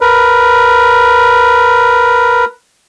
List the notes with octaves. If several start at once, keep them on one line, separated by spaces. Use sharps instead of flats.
A#4 B4